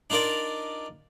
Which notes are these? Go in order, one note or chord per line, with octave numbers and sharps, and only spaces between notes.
D4 D#4 F4 A#4 D5